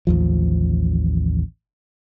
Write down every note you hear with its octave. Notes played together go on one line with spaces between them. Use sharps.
A1 D#2 F3